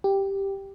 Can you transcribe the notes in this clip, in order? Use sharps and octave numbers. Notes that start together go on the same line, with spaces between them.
G4